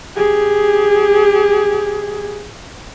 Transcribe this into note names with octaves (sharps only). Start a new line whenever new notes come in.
G4 G#4